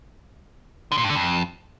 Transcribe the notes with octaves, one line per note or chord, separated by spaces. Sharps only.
D3
A#2
G2
D3
F2